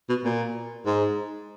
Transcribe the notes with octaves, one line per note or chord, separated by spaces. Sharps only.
B2
A#2
G#2